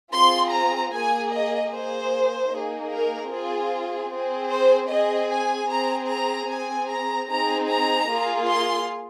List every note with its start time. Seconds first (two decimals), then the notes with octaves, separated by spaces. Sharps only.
0.13 C4 F4 G#4 C6
0.53 A#5
0.93 A#3 G#4 G#5
1.32 D#5
1.72 A#3 G#4 C5
2.52 A#3 D#4 G#4
2.91 A#4
3.32 C4 F4 G#4
4.11 C4 G#4
4.51 C5
4.90 C4 G#4 D#5
5.30 G#5
5.69 C4 G#4 A#5
6.09 A#5
6.49 C4 G#4 G#5
6.88 A#5
7.28 C4 D#4 G#4 A#5
7.68 A#5
8.08 A#3 F4 G#4
8.48 C6